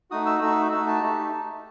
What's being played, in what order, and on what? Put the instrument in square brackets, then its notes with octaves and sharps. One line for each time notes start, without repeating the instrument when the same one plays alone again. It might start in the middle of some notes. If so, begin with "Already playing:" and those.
[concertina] A3 D#4 F#4 D#6
E6
A3 D#4 F#4 E6
A3 D#4 F#4 E6
A5
A3 D#4 G4